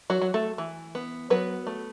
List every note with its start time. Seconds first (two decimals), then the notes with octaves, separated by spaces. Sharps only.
0.10 F#3 F#4
0.22 F#3
0.34 A3 A4
0.58 E3
0.95 B3
1.30 F#3 B3 B4
1.67 A3